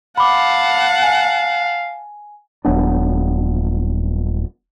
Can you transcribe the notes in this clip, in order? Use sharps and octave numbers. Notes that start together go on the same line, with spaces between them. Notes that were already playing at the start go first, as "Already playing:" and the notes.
F5 F#5 A5 B5 D6
G#5
D#1 F#3 B3 D4